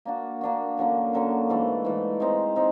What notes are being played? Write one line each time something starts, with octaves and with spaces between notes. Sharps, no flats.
A#3 D4 F#4
A#3 D4 F#4
F#2 D3 F#3 A#3
F#2 D3 F#3 A#3
G#2 E3 A3
G#2 E3 A3
G#3 C4 D#4
G#3 C4 D#4